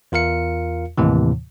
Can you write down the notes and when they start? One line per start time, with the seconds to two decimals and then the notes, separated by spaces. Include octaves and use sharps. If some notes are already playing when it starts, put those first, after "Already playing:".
0.12 E2 F4 A#4 F5 C#7
0.98 D#2 A2 C3 E3